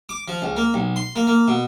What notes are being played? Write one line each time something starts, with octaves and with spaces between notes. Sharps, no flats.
D6
F3
C#2
A#3
B1
C6
A#3
A#3
B2